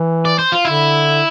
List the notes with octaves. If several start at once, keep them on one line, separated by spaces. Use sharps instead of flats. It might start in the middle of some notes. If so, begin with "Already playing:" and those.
Already playing: E3
D5
C5
F4
D3 E4